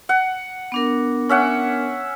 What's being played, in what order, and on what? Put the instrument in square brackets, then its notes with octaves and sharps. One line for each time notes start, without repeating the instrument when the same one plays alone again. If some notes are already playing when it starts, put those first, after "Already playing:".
[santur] F#5
[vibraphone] B3 D4 A#4
[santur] C#4 E5 F#5